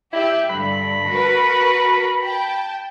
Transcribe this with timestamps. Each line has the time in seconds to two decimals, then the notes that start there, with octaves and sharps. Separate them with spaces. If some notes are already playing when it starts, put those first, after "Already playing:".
0.13 E4 G4 E5
0.50 G2 D3 B5
1.09 F#4 A#4 B4
2.23 G5 A5